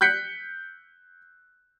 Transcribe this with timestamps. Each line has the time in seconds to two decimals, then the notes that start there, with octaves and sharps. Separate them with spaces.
0.01 F#6 G6 B6 C#7